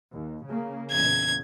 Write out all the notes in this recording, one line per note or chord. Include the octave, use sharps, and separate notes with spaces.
D#2
C#3 A#3
E2 A#2 C#3 G#6